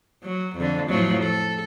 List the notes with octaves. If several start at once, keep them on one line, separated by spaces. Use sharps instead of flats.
F#3
F2 D3
A2 F3 F#3
A4